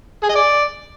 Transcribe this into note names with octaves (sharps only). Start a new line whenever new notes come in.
G#4
D#5
D5